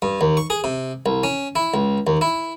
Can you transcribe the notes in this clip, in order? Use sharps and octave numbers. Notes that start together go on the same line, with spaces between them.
G2
D#2
C#6
G#4
C3
C2
C#4
E4
C#2
D#2
E4